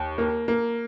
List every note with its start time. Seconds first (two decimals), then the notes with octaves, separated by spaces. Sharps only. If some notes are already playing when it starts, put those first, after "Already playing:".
Already playing: D#2
0.18 A#3
0.48 A#3